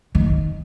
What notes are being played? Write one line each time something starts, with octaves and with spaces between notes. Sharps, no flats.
D#3